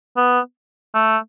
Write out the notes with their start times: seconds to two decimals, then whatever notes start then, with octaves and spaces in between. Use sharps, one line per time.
0.17 B3
0.94 A3